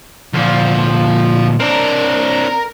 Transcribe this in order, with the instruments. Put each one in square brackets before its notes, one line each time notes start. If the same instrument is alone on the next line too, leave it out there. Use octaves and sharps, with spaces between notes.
[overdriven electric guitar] D2 A#2 [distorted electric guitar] F3
[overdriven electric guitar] C4 D4 [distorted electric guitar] A#4